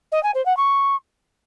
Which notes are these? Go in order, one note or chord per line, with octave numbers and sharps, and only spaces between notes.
D#5
G#5
C5
F#5
C#6